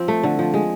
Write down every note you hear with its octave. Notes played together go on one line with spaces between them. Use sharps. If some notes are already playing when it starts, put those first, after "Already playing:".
Already playing: F3 C4
A3
D3
F3
G#3